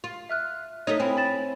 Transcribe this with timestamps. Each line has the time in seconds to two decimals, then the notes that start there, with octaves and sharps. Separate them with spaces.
0.04 F4
0.29 E5 F6 F#6
0.87 A3 D#4 C#5 B6
1.00 C4 E4 G#5
1.17 B5 A6 E7